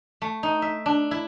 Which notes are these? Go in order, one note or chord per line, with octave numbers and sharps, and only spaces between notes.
A3
D#4
E5
D4
E4